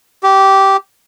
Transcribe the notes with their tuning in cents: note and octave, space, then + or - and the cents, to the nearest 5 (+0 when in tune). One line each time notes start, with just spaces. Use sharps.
G4 -15